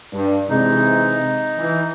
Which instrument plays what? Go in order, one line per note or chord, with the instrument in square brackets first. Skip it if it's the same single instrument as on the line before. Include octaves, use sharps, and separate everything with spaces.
[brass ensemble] G2
[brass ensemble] C3 E3 G#3 [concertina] D#4
[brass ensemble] E3